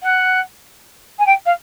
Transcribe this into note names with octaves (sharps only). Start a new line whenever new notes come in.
F#5
G#5
G5
F5